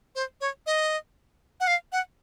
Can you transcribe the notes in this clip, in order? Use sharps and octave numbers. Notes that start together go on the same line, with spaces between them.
C5
C#5
D#5
F#5
F5
F#5